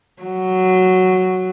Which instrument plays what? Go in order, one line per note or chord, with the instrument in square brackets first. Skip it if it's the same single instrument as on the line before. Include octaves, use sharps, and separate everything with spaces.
[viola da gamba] F#3